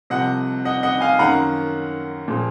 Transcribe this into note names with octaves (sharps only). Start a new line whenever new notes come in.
C2 C3 F3 D#5 F#5
D#5 F#5
D#5 F#5
F5 G#5
F#2 D#3 A#3 F#5 A#5
A#2 F3 G#3